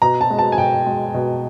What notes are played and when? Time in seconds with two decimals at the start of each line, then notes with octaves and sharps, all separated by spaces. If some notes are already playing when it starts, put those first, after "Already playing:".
0.02 B2 A#5
0.21 A5
0.30 G#3
0.39 A5
0.52 G#5
0.58 B2 G5
0.86 G#3
1.14 B2